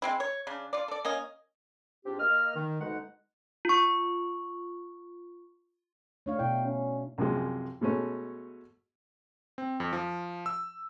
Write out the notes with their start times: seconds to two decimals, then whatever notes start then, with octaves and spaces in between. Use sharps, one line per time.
0.02 G#3 C4 E4
0.20 C#5
0.47 C#3 D4
0.73 F4 D5
0.88 A4 D5
1.05 A#3 C#4 D#5
2.05 G#2 C4 D4 F4 G4
2.19 A#3 D#5 F6
2.56 D#3
2.81 D2 B2 G#3 D#4 F#5
3.65 F4 C#6
6.26 A3 D4 C#5 F5
6.39 B2 E4 C#5 G5
6.65 C#4
7.18 C2 F#2 C3 F3 G#3
7.81 B2 G#3 A3 C#4
9.58 C4
9.80 F2
9.93 F3
10.46 E6